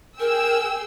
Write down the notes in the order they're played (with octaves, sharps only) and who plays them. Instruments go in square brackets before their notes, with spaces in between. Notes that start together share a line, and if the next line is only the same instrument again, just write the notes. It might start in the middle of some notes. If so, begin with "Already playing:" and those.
[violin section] G#4 G5 E6 [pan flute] A#4